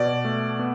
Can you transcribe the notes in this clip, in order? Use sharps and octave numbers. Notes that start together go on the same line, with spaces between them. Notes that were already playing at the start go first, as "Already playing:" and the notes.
Already playing: B2 D5
A3
B3